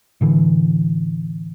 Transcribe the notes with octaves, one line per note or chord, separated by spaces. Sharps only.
A2 D3 E3